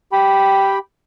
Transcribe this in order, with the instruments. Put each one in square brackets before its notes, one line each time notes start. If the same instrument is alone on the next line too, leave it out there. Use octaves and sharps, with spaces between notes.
[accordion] G4 G5 B5